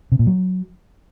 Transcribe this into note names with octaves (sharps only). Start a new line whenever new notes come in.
C3
A#2
F#3